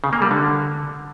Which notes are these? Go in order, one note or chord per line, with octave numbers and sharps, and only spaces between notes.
C#3
A#3
G3
D3